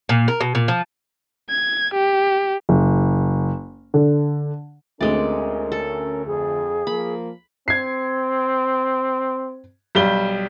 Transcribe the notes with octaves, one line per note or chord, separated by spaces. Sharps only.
A#2
A#4
B2
A#2
F3
G#6
G4
F#1
D3
D2 D3 G#3 C4 C#4 A#4 D5
A4
F2 G#4
F3 A#3 B5
C4 G#6 C7
B1 G3 G7